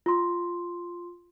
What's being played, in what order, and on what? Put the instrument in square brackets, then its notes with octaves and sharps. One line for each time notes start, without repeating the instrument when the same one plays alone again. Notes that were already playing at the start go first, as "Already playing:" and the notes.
[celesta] F4 C6